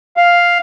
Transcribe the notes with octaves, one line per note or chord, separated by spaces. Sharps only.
F5